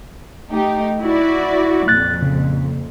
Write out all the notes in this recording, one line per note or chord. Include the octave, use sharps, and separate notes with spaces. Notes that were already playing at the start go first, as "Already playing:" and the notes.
A3 D#4 G4
E4 F#4 D5
F2 A#2 F#6 A6
C#3